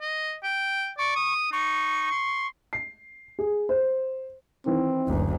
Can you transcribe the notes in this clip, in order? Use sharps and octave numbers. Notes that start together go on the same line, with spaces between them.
D#5
G5
D5 C#6
D#6
D#4 C#6
C6
C7
G#4
C5
D#3 E3 C4
F#1 D2